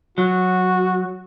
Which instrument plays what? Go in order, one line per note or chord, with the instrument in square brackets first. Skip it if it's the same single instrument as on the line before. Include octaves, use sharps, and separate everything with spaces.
[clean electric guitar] F#3 [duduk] F#4